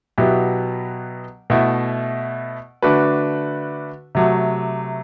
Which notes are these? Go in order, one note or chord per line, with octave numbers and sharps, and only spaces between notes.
B2 F#3 B3 E4 G4
B2 A3 E4
D3 A3 D4 F#4 B4
C3 F#3 A3